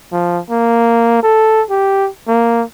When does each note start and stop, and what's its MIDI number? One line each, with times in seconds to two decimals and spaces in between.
0.12 0.40 53
0.50 1.21 58
1.23 1.62 69
1.70 2.09 67
2.28 2.63 58